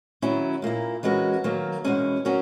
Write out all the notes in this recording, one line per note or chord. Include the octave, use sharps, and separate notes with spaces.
D#3 F#3 C#4 E4
A#2 A#3 E4
E3 G#3 C#4 F#4 A#4
D#3 F#3 A#3
E2 B2 G#3 C#4
F#3 C#4 F#4 A#4